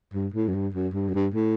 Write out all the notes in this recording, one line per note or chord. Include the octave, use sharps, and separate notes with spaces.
G2
A2
F#2
G2
F#2
G2
F#2
G2
A2